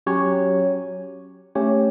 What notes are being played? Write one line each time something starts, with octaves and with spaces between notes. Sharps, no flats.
F#3 C#4 G4 C#5
A3 C#4 G4 C#5